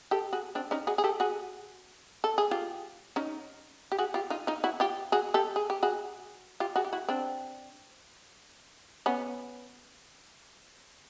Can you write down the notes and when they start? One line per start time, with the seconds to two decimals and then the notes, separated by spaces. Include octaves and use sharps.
0.11 G4 A4
0.33 F#4 G#4
0.55 C4 D4
0.71 C#4 D#4
0.87 F#4 G#4
0.98 G#4
1.04 G4 A4
1.20 F#4 G#4
2.24 A4
2.38 G#4
2.51 F4 G4
3.16 C#4 D#4
3.92 G4
3.98 F#4 G#4
4.14 F4 G4
4.30 D#4 F4
4.47 D#4 F4
4.64 E4 F#4
4.80 F4 G4
5.12 F#4 G#4
5.34 G4 A4
5.56 G#4
5.70 G4
5.83 F#4 G#4
6.60 F4 G4
6.76 F#4 G#4
6.85 G4
6.93 E4 F#4
7.09 C4 D4
9.06 B3 C#4